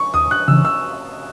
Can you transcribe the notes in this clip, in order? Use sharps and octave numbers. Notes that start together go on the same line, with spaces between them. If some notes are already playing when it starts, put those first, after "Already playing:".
Already playing: C#6
D#2 D#6
F#6
C#3 E3 E6
E6